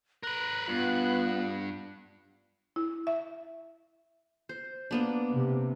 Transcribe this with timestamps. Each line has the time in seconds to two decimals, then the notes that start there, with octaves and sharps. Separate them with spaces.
0.23 A#4 B4 F#6
0.68 G2 B3 F4
2.76 E4
3.07 E5
4.49 C5
4.91 A#3 B3 D4
5.32 C3